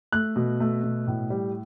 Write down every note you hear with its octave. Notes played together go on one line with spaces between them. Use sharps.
A3 F#6
B2
A3
B2
A2
G3